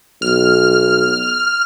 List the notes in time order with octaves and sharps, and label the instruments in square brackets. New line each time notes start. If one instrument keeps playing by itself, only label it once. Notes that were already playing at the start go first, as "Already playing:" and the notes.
[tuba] B1 [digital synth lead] F6